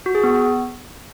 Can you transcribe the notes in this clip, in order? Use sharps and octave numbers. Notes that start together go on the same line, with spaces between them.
F#4
G#4
B3